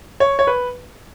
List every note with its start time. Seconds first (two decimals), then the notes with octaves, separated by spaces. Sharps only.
0.20 C#5
0.39 C#5
0.47 B4